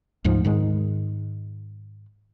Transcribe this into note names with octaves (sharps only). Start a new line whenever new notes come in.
D2 G#2 F3
G#2 D#3 G#3